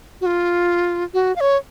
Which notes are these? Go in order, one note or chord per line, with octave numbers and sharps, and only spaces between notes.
F#4
F4
F#4
F5
C#5